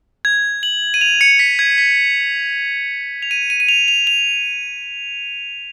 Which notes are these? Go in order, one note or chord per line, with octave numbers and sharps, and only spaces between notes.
G#6
F#7
D#7
F7
C#7
B6
G#6
B6
F7
D#7
D#7
D#7
F7
F7
F7